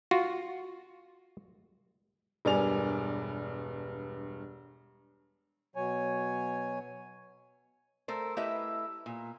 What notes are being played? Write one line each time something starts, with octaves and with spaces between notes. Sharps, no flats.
F4 F#4
E1 G2 D5 G#5 F7
B2 F#3 C#5 G#5
A3 A4 A#4 C5
A3 E4 G4 B4 D#5 E5
A#2